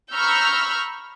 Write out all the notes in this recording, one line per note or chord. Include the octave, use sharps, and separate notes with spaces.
A#5 B5 C#6 E6 F6 G6